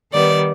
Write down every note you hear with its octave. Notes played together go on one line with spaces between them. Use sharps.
D#3 G3 B3 D5